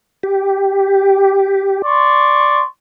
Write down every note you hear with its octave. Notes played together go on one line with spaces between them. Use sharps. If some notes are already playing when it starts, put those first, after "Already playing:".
G4
D5 C6 C#6